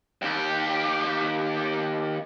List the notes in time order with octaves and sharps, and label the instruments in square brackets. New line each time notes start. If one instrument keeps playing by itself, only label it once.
[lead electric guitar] D#2 G4